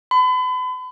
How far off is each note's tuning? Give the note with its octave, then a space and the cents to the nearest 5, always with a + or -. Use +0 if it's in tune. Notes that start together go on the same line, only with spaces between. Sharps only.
B5 +40